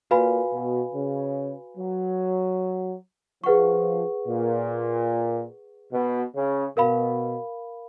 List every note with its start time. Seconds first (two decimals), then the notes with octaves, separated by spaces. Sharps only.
0.11 A#2 F#4 B4 F5 G#5 B5
0.53 B2
0.94 C#3
1.77 F#3
3.44 F3 G#4 B4 F#5 C#6
4.27 A#2
5.93 B2
6.36 C#3
6.77 B2 A#4 F5 B5